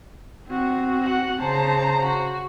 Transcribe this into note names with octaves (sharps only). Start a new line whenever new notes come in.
C4 F#4
F#5
C#3 C5 A5 A#5
F#4